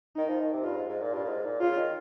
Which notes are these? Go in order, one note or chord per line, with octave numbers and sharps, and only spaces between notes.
D#3 D#4
F3
D#3
C3
G2 F4
G#2
G#2
A#2
G2 F4
A#2
G#2
A#2
C#3 F4
D#3